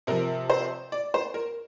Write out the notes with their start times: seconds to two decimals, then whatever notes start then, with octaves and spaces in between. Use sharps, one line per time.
0.07 C3 F3 A#4
0.50 C5
0.92 D5
1.14 C5
1.34 A#4